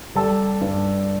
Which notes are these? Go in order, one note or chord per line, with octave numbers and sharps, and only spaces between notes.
G3 A4 A5
G2